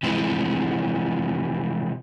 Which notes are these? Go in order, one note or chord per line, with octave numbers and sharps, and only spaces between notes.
C3 E3 F3 G#3